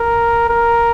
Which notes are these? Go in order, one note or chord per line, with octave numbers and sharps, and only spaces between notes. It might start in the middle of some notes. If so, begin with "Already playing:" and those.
Already playing: A#4
A#4